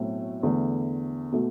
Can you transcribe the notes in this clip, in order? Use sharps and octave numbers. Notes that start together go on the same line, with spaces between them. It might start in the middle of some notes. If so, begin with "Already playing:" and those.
Already playing: B1 A2 F#3 A3 C4
E2 D3 A3
B2 A3